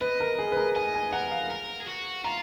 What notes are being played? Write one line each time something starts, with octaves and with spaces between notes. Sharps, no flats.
B4 D#5
A#4
G#4
B4
A#4
D#5 G#5
G#5
A#4 F#5
F5
A#4
G#4
F#4
F4 A#5